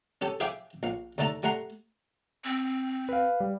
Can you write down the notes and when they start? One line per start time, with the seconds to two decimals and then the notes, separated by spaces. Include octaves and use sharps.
0.21 C#4 G4 A4 A5
0.40 G#4 C5 E5 F5 G5 D6
0.83 A#1 F5
1.18 D#2 D3 A3 A4 A5 A#5
1.43 G3 A3 F#5 A#5 C6
2.44 C4
3.09 B4 F5
3.40 G3